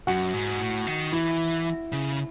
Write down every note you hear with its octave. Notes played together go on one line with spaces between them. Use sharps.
F#2 F#4 F#5
G#2
A2
D#3
E3 E4 E5
C#3